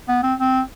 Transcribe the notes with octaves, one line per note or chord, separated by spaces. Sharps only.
B3
C4
C4